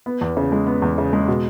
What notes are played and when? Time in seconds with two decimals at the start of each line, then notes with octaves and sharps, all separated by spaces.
0.06 B3
0.21 E2
0.37 C#3
0.52 G#3
0.67 B3
0.82 E2
0.98 C#3
1.13 G#3
1.28 B2